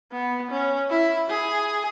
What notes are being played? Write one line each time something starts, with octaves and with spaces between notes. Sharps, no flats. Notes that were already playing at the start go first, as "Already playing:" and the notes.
B3
C#4
E4
G#4